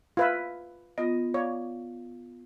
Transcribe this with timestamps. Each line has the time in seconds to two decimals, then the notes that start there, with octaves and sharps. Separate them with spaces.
0.17 F4 B4 E5 G#6
0.98 B3 F4 D#5
1.34 C#5 D5 F5